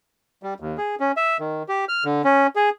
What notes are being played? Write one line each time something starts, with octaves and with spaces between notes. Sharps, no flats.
G3
D#2
G#4
C#4
E5
D#3
G4
F6
D3
C#4
G#4